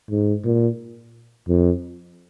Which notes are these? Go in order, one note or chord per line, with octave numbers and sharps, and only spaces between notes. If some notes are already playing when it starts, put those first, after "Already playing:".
G#2
A#2
F2